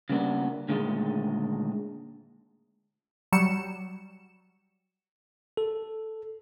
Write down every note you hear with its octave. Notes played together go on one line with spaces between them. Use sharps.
C#3 G3 A#3 B3 D4
A#2 D3 D#3 G#3 A3
F#3 G3 C#7 E7
A4